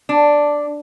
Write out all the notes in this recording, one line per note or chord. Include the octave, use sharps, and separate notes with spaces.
D4